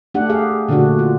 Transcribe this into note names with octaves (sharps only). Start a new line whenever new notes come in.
A3 D4 G4 F#5
G4 G#4 F5
A#2 D3 A3 D4 F#4
F4